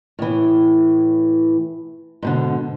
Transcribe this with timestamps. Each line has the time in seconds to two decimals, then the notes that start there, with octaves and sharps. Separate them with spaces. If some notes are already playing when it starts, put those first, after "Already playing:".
0.19 A2 E3
2.23 G#2 B2 D3